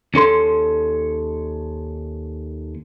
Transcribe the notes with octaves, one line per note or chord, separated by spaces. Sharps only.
D#2 C#4 A4 C6